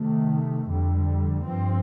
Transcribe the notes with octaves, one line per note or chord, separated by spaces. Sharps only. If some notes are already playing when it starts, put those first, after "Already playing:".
Already playing: C3 D#3 A3
F2 D3 G3
G2 F3 C4